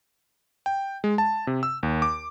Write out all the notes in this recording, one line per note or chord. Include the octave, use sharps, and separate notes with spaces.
G5
G#3
A5
C3
E6
D#2
D6